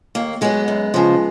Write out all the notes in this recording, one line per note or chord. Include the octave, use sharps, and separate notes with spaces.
D#2 A#3
D#3 F#3 G#3 B3
F#2
C#3 F3